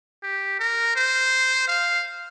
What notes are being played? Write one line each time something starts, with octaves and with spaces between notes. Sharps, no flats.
G4
A#4
C5
F5